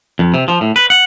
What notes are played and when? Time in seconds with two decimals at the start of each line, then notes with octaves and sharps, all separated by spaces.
0.19 F2
0.34 C3
0.48 F3
0.61 A2
0.76 B4
0.90 F#5